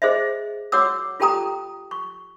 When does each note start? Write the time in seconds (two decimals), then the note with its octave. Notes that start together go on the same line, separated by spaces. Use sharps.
0.02 G#4 C5 D#5 E5
0.72 F#4 C#5 F#5 D6 E6
1.20 F4 G4 A4 G5 A#5 D#6
1.91 C#6